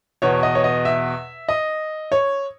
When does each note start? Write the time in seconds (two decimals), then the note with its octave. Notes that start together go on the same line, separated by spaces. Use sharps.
0.22 E2 B2 C#5
0.43 D#5
0.55 C#5
0.64 D#5
0.85 E5
1.48 D#5
2.12 C#5